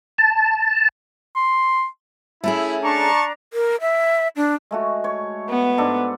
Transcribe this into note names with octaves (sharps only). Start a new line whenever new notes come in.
A5
C6
A3 C#4 E4 G#4
D4 A5 A#5 C#6
A#4
E5
D4
G#3 A3 F#4
C#5
B3
G#2 D4 A4